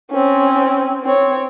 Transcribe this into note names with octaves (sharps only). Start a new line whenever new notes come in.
C4 C#4
C4 C#5